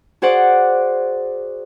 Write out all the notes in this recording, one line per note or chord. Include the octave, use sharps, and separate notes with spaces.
F#4 G#4 C5 D5 F#5